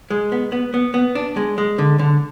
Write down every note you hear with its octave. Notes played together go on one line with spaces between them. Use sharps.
G#3
B3
B3
B3
B3
D4
G#3
G#3
D3
D3